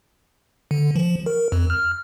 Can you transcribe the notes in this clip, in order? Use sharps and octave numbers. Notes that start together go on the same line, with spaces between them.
D3
F3
A#4
F2
F6